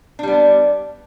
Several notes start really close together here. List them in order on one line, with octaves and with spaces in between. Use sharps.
D4 G3 B3